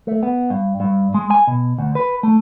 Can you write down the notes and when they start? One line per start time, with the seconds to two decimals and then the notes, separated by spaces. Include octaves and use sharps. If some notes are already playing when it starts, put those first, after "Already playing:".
0.07 A3
0.23 B3
0.50 G2
0.80 G2
1.14 G#3
1.30 G#5
1.47 B2
1.78 D2
1.95 B4
2.23 A3